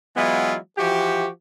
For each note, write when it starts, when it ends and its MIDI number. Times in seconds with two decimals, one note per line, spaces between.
0.16 0.56 52
0.16 0.56 54
0.16 0.56 56
0.16 0.56 59
0.16 0.56 64
0.16 0.56 65
0.78 1.27 52
0.78 1.27 53
0.78 1.27 66
0.78 1.27 67